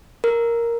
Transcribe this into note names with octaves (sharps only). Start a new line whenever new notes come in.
A#4